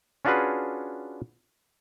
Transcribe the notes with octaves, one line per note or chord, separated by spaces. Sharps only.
C#4 D4 F4 F#4 G#4 B4